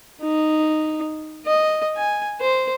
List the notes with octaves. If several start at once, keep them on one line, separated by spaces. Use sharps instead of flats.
D#4
D#5
G#5
C5